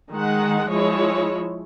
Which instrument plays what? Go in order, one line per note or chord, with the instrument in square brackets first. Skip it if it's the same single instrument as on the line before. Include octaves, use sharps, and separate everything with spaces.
[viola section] D#3 G#3 F#5
F3 G#3 E4 C#5